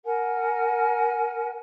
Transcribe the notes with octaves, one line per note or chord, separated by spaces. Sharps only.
A#4 F#5 G#5